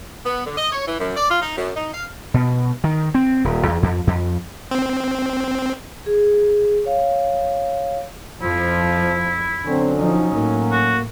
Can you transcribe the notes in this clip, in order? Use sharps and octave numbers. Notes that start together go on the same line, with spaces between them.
B3
D3
D#5
C#5
E3
F#2
D5
F4
D#4
F#2
D#4
F5
B2
D#3
C4
D#1
E2
F2
F2
C4
G#4
C#5 F5
F2 F3 E4
D3 F#3 C4 C#4
F3 D#4
A2 A#3
F#4